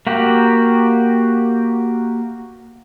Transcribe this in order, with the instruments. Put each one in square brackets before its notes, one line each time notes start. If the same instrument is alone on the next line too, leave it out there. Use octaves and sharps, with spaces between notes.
[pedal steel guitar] A#3 F#4 G4